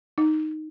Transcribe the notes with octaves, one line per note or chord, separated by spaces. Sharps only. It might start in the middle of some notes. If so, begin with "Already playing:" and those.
D#4